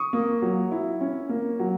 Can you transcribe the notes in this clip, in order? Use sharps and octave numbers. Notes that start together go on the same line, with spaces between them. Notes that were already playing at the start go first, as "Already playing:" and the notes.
Already playing: C#6 D#6
A#3
F#3
E4
C#4
A#3
F#3